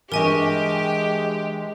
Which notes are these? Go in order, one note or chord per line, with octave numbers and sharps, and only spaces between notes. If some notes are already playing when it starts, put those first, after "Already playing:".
E3 G#3 D4 G4 A#4 D#5 G#5 C#6